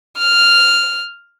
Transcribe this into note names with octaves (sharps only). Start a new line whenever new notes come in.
F6